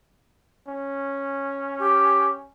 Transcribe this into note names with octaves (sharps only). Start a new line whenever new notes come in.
C#4
G4